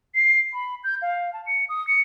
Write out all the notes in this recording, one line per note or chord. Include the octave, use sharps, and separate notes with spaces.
C7
B5
G6
F5
A5
C#7
D#6
C#7